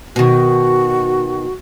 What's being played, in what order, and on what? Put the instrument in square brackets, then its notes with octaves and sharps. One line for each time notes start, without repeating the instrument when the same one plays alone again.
[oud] B2 D#3 [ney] F#4